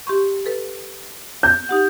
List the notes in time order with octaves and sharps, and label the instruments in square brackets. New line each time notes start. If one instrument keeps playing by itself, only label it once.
[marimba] G4 C6 C#6
A4 B4
[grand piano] G6
[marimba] D#4 G4 F#5